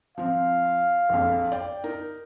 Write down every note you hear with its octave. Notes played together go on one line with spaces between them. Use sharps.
F3 C4 F5
A#1 F2
D5 G5
D#4 A#4